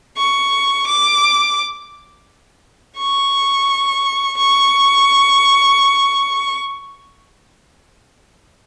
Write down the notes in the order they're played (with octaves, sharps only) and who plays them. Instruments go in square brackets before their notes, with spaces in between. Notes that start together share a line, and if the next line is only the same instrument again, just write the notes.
[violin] C#6
D6
C#6
C#6